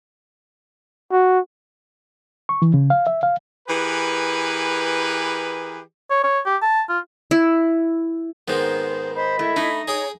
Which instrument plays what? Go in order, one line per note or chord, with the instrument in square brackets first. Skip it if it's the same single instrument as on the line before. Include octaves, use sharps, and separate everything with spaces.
[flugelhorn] F#4
[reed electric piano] C#6
E3
C#3
F5
E5
F5
[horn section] E3 G4 G#4 A#4 B4
[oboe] C#5
C#5
G4
A5
F4
[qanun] E4
[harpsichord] G#2 D#3 C4 [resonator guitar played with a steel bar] B3 [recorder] C5
[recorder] C5 [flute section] D#5 B5
[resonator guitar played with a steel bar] A3 [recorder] E4
[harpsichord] A3 [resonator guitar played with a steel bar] D#4
[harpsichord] G#4 G5 D#6 [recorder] C#5